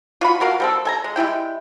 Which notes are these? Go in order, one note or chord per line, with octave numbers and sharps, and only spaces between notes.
F4 F#4 B5
F#3 F#4 A#4 F5
G3 C4 A4
A4 G#5 A#5
G#3
G3 G#3 E4 G5